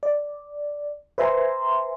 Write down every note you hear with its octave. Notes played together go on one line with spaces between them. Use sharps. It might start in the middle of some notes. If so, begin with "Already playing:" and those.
D5
B4 C5 E5 G#5 A#5 C6